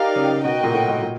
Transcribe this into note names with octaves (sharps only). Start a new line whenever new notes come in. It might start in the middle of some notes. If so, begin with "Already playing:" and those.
Already playing: D#4 G4 A#4 D5 F5
C#3
C#3
B2 F#4 A#4 D#5 G5
A#2
A2
G#2
A#2